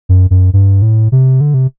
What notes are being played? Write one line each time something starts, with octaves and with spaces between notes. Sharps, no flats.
F#2
F#2
G2
A2
C3
D3
C3